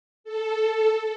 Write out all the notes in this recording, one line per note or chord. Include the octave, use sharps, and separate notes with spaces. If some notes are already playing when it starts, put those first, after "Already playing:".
A4